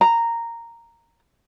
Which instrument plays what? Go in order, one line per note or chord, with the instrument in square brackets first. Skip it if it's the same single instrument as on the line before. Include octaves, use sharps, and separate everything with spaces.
[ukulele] A#5